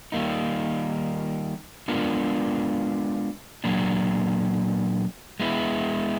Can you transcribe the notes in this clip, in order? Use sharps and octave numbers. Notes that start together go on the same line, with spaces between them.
D#3 G3 A#3 D#4
G#3 B3 D4 F4 A#4
A#2 F#3 A#3 D4
G#3 B3 E4